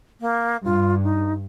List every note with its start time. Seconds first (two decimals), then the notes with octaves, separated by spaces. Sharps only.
0.20 A#3
0.64 G2 F4
1.03 D#4